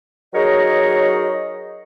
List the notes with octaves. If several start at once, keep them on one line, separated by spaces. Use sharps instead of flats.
F#3 D#4 G#4 A#4 C#5 D#5